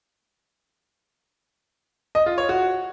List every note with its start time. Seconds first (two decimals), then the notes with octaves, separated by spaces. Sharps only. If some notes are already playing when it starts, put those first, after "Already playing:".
2.15 D#5
2.26 F4
2.38 C#5
2.49 F#4